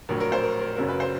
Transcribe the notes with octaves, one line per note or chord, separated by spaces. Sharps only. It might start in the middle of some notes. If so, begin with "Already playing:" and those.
A#1 A2 F#3 A#4
A#4
C5
A#4
A#4
F#1 F#2 C#3 F#3 A#4
B4
C5